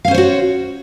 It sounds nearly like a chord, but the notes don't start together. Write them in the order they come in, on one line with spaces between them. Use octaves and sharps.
F5 C#4 C5 C#5 F#4